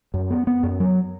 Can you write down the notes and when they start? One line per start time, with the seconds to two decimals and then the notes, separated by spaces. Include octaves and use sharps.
0.14 F#2
0.30 B3
0.47 B3
0.63 F#2
0.80 F#3